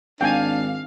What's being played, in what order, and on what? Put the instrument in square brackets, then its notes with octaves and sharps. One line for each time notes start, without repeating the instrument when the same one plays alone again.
[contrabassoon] G#1 [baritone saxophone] D4 [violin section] F5 [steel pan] G5 G#5